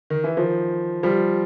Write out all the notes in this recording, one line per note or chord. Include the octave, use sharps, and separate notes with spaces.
D#3
E3
D#3 F3
F3 G3